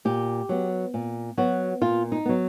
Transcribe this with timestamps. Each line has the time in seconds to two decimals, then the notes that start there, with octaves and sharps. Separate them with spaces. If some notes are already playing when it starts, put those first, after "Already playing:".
0.05 A#2 G4
0.49 F#3 B3
0.94 A#2
1.38 F#3 B3 F#4
1.81 A#2 F4
2.12 D#4
2.25 F#3 B3